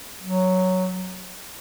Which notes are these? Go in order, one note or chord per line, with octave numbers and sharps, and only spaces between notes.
F#3